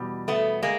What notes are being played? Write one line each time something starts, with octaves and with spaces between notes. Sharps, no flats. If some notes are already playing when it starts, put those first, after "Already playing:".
Already playing: E2 B2 G3
A3 B3
G#3 A#3